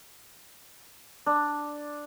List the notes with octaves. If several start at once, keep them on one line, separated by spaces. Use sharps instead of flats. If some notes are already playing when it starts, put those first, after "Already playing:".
D4